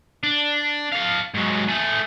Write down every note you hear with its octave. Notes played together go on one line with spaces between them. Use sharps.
D4
A4 F5
G#2 F#3
A3 G#4